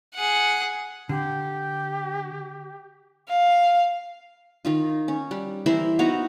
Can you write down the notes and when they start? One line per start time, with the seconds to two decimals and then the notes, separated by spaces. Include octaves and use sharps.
0.15 G#4 F#5
1.09 D3 G4
3.29 F5
4.65 D#3 D#4 F4
5.08 C#4
5.31 G3
5.66 E3 E4 A#4 C5
5.99 B3 D#4 F#4 A#5